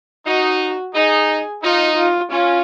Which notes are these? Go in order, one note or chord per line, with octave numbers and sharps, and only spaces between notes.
D#4 F#4
D#4 G#4
D#4 F4
F4
C#4 F4